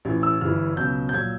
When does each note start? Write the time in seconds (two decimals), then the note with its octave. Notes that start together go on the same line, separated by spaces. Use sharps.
0.05 A1 A2 E3
0.23 E6
0.41 G1 G2 E3 F6
0.77 C#2 B2 F#3 G6
1.09 G6
1.14 A#2 F#3 G#6